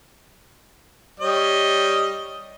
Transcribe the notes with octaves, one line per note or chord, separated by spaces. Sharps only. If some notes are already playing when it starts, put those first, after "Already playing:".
G3 C#5 D#5